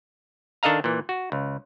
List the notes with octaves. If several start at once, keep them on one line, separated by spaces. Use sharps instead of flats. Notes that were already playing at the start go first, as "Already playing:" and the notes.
D#3 D4 A4 D#5 F5 A#5
A#2 E3
F#4
C#2